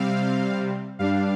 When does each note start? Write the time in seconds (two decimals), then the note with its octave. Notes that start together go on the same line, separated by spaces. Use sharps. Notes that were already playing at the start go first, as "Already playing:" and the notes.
Already playing: C3 G3 C4 F5
0.99 G2 G3 D4 F5